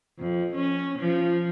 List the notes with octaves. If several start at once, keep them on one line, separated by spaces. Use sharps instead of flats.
F2
C#4
F3